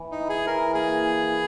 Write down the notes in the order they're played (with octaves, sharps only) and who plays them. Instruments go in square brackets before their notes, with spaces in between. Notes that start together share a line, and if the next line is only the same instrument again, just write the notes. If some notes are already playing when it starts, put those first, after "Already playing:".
Already playing: [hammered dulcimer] E3
[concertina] D#4
[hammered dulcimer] E4
[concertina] G#4
[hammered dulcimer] E3 [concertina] A#4
[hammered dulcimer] A#3 [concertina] G#4
[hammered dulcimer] E3
E4